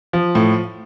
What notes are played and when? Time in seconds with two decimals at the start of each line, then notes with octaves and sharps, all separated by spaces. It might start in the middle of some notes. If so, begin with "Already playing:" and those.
0.13 F3
0.35 A2